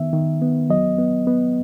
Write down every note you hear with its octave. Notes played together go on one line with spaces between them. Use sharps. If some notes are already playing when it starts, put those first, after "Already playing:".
Already playing: D#3 B3 E5
D#3
B3
F#3 D#5
B3
B3